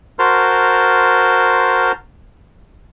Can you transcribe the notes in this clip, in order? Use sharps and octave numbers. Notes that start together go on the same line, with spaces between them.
F#4 A#4 C5 A5 C6 F6